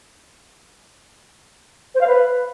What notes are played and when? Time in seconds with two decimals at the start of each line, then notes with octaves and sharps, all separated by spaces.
1.95 C5
2.01 F5
2.07 B4